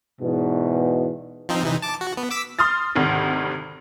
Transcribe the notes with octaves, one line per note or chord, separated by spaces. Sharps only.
E2 G#2 B2
F3 C4 D#4
C3 E3 D#4
A5 D6
F#4
B3
D6 E6 B6
C6 D#6 F6 A6
G#1 D2 C3 D#3